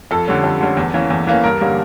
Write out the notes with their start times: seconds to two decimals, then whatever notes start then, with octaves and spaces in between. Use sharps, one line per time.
0.11 F2 A4
0.27 D3 G3 C#4
0.44 F2
0.61 D3 G3 C#4
0.77 E2
0.94 E3 A#3 C#4
1.10 E2
1.27 E3 A#3 C#4
1.44 G2 A#4
1.61 D3 G3 A#3 C#4